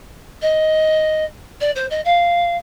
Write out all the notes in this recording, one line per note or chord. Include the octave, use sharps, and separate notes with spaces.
D#5
D5
C5
D#5
F5